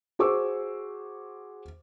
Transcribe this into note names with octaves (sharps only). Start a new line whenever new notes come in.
F#4 G#4 C5 C#6 D6 E6